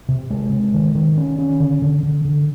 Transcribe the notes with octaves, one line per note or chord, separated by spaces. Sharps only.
C3
G#3
C3
D#3
D#3
C#4
C#4
D3
D3
D3
D3